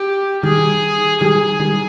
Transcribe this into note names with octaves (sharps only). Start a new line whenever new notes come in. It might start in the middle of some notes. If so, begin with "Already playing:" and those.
Already playing: G4
D#3 G3 G#4
D#3 G3 G#4
D#3 G3